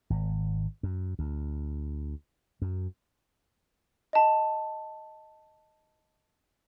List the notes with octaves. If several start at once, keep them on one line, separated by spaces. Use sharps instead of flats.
G#1
F#2
D2
F#2
D#5 A5